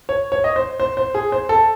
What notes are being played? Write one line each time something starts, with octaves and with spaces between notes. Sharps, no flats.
C#5
C#5
D#5
C5
C5
C5
G#4
C5
A4